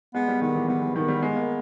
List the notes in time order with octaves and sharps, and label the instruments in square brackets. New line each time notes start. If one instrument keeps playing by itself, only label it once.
[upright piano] G#3 [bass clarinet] B3
[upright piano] G3
[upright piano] D#3 [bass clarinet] B3
[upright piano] E3
[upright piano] G3 [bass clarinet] B3
[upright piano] E3
[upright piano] D#3 [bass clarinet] B3
[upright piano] G3
G#3
A#3